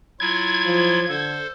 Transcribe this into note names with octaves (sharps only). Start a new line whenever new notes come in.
F#3 E4 F4 G#6
F3
D3 A4 C5